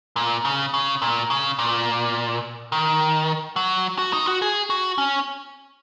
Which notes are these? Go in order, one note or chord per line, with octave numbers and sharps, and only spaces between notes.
A#2
C#3
C#3
A#2
C#3
A#2
D#3
F#3
F#4
D#4
F#4
G#4
F#4
C#4